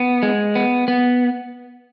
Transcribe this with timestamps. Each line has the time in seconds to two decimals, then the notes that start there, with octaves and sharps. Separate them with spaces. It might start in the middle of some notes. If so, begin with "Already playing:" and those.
Already playing: B3
0.23 G#3
0.55 B3
0.88 B3